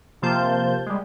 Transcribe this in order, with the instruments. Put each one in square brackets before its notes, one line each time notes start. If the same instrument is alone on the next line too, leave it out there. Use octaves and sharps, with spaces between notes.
[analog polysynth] C3 F3 A#3 F4 A5 G6
G3 G#3